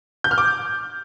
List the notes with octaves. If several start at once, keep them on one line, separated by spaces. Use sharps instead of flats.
G6
F6
D6